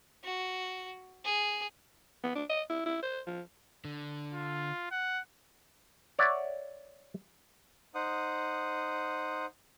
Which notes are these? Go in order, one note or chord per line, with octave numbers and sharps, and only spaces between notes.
F#4
G#4
B3
D4
D#5
E4
E4
C5
F3
D3
F4
F#5
C#5 D5 E5 F#5
D#4 C5 F#5 D#6